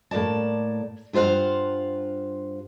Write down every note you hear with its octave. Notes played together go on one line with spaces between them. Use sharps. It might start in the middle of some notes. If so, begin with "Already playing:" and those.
A2 A#3 D5 A5
G2 F4 C5 F5 F#5